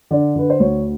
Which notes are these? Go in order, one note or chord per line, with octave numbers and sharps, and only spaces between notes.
D3 D5
D3 B4
C5
D2 C#5